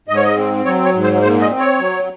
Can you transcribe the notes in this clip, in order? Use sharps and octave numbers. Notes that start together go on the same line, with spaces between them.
G#2 D#5
C#5
D#5
C4
F#3 C#5
C#5
G#2
C5
A#2 C5
D#5
C4
C#5
F#3